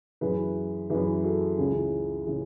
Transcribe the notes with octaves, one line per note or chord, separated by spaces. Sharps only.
F#2 E3 G#4 B4
F#2 E3 G#4 B4
F#4 A4
C#2 C#3 E3 G#4
C#3 E3 G#4